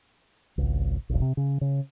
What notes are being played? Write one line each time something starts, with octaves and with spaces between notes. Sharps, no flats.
G#1 C#2
E1 B1
C3
C#3
C#3